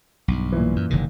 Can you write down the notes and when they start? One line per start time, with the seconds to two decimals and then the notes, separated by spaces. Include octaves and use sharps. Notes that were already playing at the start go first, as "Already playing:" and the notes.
0.28 B1 G2
0.52 A#2 E3
0.76 F#2
0.90 F#1 C3 D#3